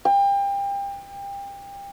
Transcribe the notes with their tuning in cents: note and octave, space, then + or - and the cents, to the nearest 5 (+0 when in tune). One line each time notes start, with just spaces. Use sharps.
G5 +30